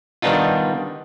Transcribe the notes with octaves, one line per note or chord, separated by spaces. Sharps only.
D#3 G3 B3 D4 D#4 F4